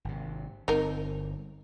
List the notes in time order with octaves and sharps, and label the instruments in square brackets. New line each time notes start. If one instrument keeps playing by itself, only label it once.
[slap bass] G#1 C3
[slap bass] G1 A#2 C4 [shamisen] D#4 A#4